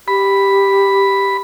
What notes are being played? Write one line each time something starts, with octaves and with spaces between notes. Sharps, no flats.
G4 B5